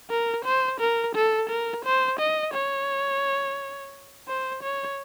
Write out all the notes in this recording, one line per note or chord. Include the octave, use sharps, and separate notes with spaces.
A#4
C5
A#4
A4
A#4
C5
D#5
C#5
C5
C#5